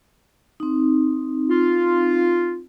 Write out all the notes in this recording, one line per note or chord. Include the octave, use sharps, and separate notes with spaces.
C4 D#4
F4